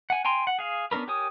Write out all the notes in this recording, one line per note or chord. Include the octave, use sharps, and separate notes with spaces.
F#5 G#5
G5 G#5 A#5 C6
F#5
G#4 F5
B3 C#4 D4 A#4 B4
G4 A#4 C#5 G#5 D#6